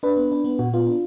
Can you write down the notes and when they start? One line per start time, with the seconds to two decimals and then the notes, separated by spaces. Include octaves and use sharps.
0.03 D4 B4
0.16 B3
0.32 D4
0.44 B3
0.59 A#2 F#4
0.73 B3 F4
0.87 D4